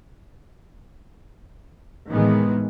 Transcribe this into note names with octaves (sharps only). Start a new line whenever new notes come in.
A2 C3 D#3 E3 G#3 B3